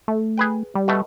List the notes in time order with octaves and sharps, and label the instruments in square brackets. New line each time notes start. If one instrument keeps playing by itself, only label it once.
[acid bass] A3
[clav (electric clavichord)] G#4 B4 G5
[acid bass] G3
[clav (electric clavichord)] B2 A3